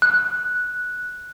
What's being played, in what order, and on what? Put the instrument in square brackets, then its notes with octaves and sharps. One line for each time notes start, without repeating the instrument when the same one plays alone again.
[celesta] F#6